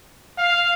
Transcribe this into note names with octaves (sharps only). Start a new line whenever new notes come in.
F5